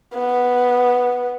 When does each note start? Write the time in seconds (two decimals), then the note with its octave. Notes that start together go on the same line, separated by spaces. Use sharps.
0.15 B3